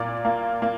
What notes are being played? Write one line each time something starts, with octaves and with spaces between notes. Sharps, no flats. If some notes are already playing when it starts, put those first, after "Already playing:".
Already playing: A#2 A#3 D5
A#3
A#3